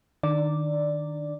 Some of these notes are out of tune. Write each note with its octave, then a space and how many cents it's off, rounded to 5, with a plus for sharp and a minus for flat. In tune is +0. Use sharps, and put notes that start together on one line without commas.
D#3 -20 D4 +0 D5 +0